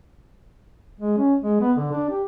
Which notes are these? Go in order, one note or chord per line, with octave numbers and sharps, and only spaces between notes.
G#3
C#4
G#3
B3
D3
D4
G4